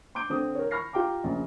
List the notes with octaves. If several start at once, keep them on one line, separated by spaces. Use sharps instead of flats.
C6 D6 G6 D7
D3 C4 D#6
A#4 C#5
B5 C#6 F6 A#6 C7
F4 G4 G5 A#5 D6
A#1 C#3